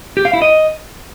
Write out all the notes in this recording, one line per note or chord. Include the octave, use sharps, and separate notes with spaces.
G4
F5
E4
D#5